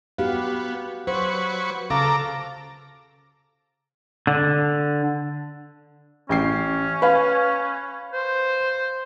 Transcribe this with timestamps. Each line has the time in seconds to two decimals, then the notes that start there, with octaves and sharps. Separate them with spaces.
0.18 B3 F#4 G4 F5
1.07 F#3 B4 C5 C#6
1.90 C#3 A4 F5 A#5 D6
4.27 D3
6.29 A1 C#4 G5 C7
7.02 B4 F5
8.13 C5